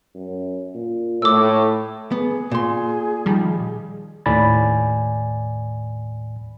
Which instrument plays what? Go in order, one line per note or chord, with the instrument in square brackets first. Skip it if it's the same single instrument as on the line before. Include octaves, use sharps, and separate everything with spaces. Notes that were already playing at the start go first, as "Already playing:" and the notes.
[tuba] F#2
A#2
[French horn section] A2 [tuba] A3 [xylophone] D6 E6
[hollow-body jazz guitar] B3 [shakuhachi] G#4
[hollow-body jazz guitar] A#2 C6
[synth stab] D#3 F3 G3
[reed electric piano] D#2 A2 D5 G#5 B5 A6